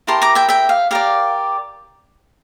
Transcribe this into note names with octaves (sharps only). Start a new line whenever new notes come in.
E4 G4 A#4 A5 C6
A#5 D6
E5 G5
E5 G5
F5
G4 A#4 D5 F5